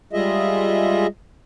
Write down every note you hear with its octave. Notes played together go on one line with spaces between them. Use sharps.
G3 G#3 F4 G#4 D#5 E5